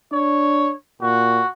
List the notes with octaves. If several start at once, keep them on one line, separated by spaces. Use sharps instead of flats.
D4 C#5
A#2 F#4